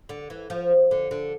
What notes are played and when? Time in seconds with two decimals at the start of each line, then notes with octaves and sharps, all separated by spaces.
0.09 D3
0.30 E3
0.50 F3
0.91 D3
1.11 D3